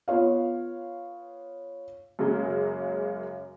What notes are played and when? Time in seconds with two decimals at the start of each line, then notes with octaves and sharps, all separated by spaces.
0.08 B3 F4 C#5 F5
2.19 F#2 C#3 F#3 G#3 A#3